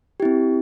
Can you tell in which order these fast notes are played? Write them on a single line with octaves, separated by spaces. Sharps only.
G4 E4 C4